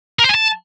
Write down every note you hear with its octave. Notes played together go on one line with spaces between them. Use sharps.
A#4
C5
G#5
A5